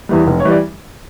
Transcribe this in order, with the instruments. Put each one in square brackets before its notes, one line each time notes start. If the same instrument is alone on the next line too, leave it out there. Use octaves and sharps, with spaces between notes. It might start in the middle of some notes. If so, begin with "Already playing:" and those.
[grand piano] E2 E3 G3
F1
C#5 C#6
E3 G3
D5